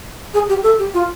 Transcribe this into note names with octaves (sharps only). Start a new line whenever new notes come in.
G#4
G4
A4
G4
F4